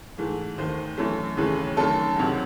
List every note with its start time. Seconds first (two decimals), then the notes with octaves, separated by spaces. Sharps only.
0.18 G#2 E3 A3
0.58 D#2 D#3 A3 C5
0.98 F#2 E3 A3
1.37 D#2 C#3 E3 A3
1.77 F#2 D#3 A3 A4
2.16 C#2 C3 D#3 F#3